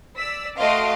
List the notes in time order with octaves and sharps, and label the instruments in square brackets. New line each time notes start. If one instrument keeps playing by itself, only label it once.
[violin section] D5 E6 B6
A3 F#4 D#5 F5 C6 D7